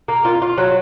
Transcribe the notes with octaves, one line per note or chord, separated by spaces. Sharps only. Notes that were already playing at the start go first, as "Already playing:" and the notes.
A#3
F4
F4
F#3